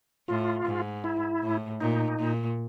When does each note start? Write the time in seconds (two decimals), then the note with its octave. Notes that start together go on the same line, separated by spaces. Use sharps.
0.28 A2 F4
0.66 G#2
1.04 E4
1.43 A2
1.80 A#2 D#4
2.19 A#2